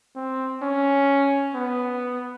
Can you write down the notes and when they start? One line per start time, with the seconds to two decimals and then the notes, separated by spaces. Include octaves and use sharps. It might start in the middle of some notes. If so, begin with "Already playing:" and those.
0.16 C4
0.62 C#4
1.55 B3